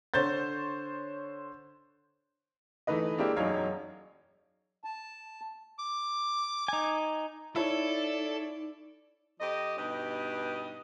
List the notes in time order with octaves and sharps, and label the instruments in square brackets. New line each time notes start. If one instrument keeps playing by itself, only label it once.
[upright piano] D3 C5 C#5 G6 A6
E3 A3 D#4 B4 D#5
G#3 A#3 C4 D4 E4 G4
E1 F#2 F#3 D#4 C#5 F5
[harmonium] A5
[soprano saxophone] D6
[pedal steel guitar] D#4 G#5
[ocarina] D#4 [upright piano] E4 C#5 [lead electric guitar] A4 A5 [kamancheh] D5
[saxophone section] F2 F3 G4 D#5
G2 B2 D#4 G4 B4 D#5